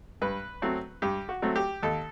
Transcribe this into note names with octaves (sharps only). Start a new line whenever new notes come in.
G2 B4
F#3 A3 C4
G2 G4
F#4
F#3 A3 C4
G4
D#2 A4